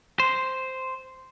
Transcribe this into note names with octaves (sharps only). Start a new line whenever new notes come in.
C5